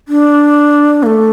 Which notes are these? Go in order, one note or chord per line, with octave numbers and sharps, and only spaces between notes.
D4
A#3
A3